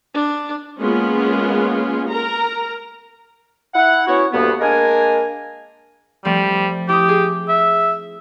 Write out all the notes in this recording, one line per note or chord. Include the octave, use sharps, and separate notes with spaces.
D4
G#3 A#3 B3 C#4 F4
A#4 A#5
E4 F#5
B3 C#4 E4 F#4 C#5
D2 G2 A#3 B3
G#3 A#3 D4 A#4 G#5
F3 G3 A3 C4
E4 G4 D#6
G#4
E5